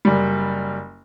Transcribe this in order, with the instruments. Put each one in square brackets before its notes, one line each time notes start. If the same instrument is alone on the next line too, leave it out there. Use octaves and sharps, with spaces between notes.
[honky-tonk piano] F#1 G3